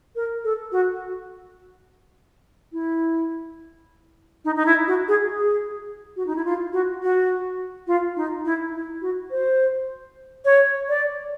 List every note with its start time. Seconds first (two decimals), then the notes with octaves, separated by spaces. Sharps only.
0.16 A#4
0.44 A4
0.72 F#4
2.73 E4
4.45 D#4
4.56 D#4
4.66 E4
4.87 F#4
5.08 G#4
5.30 G#4
6.16 F#4
6.27 D#4
6.36 E4
6.45 F4
6.73 F#4
7.02 F#4
7.87 F4
8.16 D#4
8.45 E4
8.74 E4
9.02 F#4
9.31 C5
10.45 C#5
10.89 D5